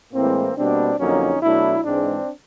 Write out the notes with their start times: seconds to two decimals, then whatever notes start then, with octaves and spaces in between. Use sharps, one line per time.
0.14 A2 E3 G#3 A#3 C4
0.57 B2 G3 A#3 C4 D4
0.99 F2 D3 F#3 A#3 C#4 D#4
1.42 B2 F#3 A3 D4 E4
1.85 G#2 E3 G#3 C4 D4